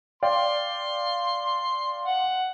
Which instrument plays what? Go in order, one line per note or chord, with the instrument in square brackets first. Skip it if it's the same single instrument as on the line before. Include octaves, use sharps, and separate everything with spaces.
[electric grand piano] D5 F5 G5 [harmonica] C6
[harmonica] F#5